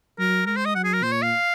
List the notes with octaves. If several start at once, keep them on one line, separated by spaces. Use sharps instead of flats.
F#3 A#4
G#3 A#4
C5
D#5
F#3 F#5
G#4
A#4
A#2 C5
C#5
F5